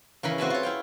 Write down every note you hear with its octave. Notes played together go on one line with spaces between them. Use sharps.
C#3 E3 A#4 B5
C4 F#4 E5 G#5 A5 B5
F4 C#5
E4 F5 G5